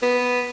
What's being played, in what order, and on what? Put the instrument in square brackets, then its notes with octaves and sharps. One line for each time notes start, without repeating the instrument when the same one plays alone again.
[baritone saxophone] B3